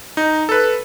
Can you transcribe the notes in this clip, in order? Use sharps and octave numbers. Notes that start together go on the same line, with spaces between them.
D#4
A4 B4